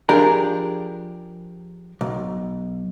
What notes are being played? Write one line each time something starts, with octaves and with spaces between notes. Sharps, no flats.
F3 D4 G4 G#4 A#4
B1